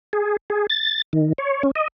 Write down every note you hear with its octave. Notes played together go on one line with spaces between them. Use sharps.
G#4
G#4
A6
D#3
C#5
C#4
D#5